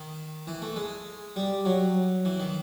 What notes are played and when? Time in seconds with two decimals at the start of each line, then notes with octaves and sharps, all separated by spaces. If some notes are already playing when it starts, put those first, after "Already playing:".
Already playing: D#3
0.47 E3
0.62 A3
0.76 G#3
1.36 G3
1.65 F#3
2.25 E3
2.40 D#3